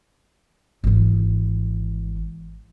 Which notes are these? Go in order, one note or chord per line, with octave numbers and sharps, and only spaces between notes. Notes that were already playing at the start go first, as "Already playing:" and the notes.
G#1 E3